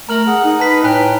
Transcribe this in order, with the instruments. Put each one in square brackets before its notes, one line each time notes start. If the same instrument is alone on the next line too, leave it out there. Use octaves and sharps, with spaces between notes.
[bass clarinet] A3 [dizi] A#4 [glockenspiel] A#5 F6 F#7
[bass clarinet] G#4 [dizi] F#5
[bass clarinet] D#4
[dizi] B4 [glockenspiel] A5 B6
[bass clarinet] A2 [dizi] G5 [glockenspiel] G#5 A#5 F#6